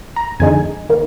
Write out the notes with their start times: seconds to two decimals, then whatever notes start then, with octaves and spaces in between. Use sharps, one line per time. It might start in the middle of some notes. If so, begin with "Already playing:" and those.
0.16 A#5
0.40 F2 D3 G#3 D#4 G#5
0.89 D#3 A#3